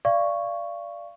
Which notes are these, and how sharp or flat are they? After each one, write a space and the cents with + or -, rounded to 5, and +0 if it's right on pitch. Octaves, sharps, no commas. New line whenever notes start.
D5 -5 F5 -25 C#6 +0